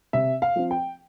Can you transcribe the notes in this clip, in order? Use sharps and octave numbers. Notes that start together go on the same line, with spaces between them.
C3 E5
F5
F3 C4
G5